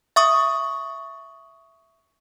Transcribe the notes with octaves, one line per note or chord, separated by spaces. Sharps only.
E5 C#6 D#6